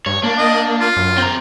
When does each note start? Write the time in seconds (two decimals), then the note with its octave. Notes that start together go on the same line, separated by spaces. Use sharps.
0.06 G2 C#5
0.23 A#3 D4
0.38 D#5
0.80 F4
0.96 F#2
1.18 C4 A#5